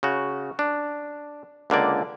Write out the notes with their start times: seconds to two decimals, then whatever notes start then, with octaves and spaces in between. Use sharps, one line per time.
0.03 C#3 F#4
0.59 D4
1.70 C#2 D3 A#3 D5